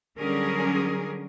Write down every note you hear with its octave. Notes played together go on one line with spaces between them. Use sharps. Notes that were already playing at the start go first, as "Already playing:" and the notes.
D3 F#3 G3 C#4 G#4 A#4